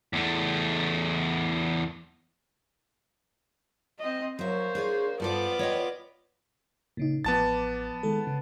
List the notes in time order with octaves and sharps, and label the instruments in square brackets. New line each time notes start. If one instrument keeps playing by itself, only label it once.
[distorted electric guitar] E2 A3
[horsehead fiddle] C4 D#5
[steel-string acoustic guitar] F#3 E5 [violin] A#3 [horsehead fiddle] C5 C#5
[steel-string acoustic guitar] D4 G#4 D5
[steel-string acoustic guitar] G2 A4 C5 [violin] B3 D6 [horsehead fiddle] F4 D5
[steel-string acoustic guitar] C#5 D#5 G5
[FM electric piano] A#2 C#3 D#4
[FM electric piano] A1 F3 D6 [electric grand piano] B3 A5 A6
[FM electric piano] D#3 G#3 A4
C#3